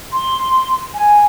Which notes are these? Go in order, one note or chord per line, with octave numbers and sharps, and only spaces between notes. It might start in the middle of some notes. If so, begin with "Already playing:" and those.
C6
G#5